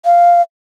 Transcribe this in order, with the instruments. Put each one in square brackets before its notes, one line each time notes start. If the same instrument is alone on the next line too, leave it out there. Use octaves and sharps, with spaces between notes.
[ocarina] F5